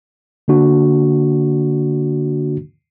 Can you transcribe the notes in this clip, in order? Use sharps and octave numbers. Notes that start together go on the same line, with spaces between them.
D3 A#3 D4 F#4